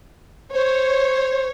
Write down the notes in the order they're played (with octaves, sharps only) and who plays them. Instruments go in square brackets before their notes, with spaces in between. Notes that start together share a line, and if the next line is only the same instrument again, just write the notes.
[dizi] C5 [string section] C#5